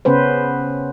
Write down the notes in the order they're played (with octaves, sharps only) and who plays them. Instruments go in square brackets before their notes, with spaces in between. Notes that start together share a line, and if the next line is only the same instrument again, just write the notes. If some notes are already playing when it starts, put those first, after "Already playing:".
[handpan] C#3 B3 C#4 B4 C5